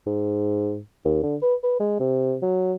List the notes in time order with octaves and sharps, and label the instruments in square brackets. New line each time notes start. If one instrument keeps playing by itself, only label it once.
[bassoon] G#2
D#2
D3
B4
B4
G#3
C3
F#3